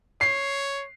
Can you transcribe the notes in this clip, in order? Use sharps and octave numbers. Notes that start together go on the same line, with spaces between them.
C#5 C7